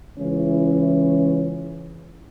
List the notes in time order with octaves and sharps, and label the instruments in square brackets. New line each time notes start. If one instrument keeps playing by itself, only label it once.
[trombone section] C#2 E3 C#4 E4